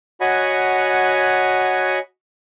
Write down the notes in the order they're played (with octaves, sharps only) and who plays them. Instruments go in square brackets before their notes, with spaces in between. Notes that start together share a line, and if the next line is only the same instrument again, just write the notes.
[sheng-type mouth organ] F#4 C#5 D#5 F#5 G#5 B5